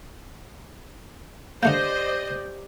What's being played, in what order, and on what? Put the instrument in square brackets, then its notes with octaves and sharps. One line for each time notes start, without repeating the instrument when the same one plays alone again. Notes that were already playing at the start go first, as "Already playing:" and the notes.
[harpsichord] D3 A3 A#3 [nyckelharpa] G4 D5 [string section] C5 D#5 [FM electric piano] G6